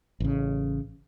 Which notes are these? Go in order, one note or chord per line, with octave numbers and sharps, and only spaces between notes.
A1 C#3